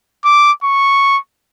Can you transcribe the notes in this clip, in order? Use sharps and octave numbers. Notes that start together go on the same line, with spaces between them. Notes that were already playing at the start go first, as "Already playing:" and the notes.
D6
C#6